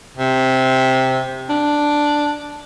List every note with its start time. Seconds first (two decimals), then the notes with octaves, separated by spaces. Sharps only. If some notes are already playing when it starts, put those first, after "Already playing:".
0.17 C3
1.49 D4